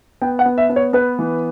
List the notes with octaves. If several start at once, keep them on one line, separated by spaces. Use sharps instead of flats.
B3 G5
F#5
B3
E5
B3
C#5
B3 B4
E3